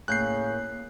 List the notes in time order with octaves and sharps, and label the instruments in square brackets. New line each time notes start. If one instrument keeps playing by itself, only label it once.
[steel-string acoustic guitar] A2 [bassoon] C#3 [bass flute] A#3 [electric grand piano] F#6 G6 C7